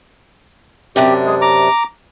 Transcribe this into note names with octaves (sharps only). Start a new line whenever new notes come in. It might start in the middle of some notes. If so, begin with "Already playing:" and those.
F#2 C3 D4 G4
G#3
A#5 D6